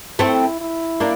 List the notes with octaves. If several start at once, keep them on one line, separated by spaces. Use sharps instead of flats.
A3 C4 E4
E4
A#3 D4